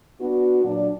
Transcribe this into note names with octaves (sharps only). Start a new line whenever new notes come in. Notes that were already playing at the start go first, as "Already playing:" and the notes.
B3 D4 F#4
A#2 F#3 D4